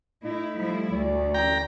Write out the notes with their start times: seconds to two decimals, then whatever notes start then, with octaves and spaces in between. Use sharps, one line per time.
0.24 A2 A3 D#4 E4
0.57 F3 G3 E4
0.92 D2 D5
1.34 A1 G5 A#5